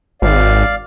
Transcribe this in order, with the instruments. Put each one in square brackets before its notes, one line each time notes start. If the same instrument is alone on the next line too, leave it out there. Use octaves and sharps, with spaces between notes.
[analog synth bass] G#1 [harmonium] D5 F5